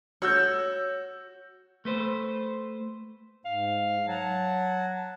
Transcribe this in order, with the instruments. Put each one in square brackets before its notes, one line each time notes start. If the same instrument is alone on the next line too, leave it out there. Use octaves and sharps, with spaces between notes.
[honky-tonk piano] F#4 E6 G6 [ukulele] C#5
[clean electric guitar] A3 B4 C5
[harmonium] G#2 [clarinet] F5
[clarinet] F#3 [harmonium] F#5 A5